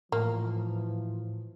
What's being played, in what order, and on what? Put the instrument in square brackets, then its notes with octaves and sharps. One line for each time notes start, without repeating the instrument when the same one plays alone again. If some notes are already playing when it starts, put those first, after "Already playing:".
[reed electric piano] A2 [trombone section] E3 F3 [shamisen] A#3